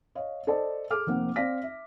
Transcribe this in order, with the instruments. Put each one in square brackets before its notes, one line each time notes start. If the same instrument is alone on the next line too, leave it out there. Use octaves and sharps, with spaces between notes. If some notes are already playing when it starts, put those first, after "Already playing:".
[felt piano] C#5 D#5 F5
A4 C5 D5 D#5 A5
G#4 A4 D6 F6
F1 A#3 C4 F#5
C4 D5 F5 A#6 B6
E5